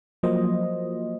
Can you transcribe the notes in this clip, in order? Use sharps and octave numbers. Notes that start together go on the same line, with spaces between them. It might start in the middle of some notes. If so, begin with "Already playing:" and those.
F3 F#3 A#3 C5 D#5